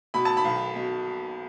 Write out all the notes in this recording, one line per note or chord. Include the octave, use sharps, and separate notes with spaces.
B2 B5
A5
B5
B1
B2